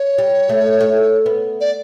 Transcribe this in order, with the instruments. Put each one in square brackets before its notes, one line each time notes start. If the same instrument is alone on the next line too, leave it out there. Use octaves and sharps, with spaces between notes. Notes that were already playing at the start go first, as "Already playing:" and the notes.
Already playing: [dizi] C#5
[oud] G3
A3
A3
B3
[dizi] D5